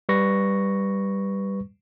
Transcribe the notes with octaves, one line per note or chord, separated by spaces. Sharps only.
G3 B4 C#6 A#6